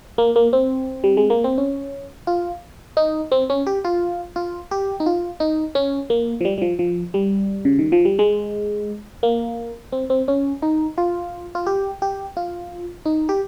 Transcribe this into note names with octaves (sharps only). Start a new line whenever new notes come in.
A#3
A#3
C4
G3
G#3
A#3
C4
C#4
F4
D#4
C4
C#4
G4
F4
F4
G4
D#4
F4
D#4
C#4
A#3
F3
G3
G3
F3
F3
G3
C#3
D#3
F3
G3
G#3
A#3
C4
C4
C#4
D#4
F4
F4
G4
G4
F4
D#4
G4